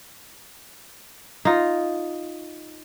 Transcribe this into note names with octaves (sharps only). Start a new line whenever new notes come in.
D#4 F4